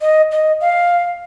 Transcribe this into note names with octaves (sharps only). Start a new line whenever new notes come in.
D#5
D#5
F5